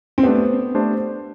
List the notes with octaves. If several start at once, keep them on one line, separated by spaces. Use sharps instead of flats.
C4
A3 B3 D4 G4 C5
A3 D4 G4 C5